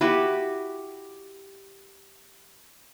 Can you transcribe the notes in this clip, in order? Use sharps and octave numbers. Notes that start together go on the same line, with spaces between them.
E4 F#4 G4 B4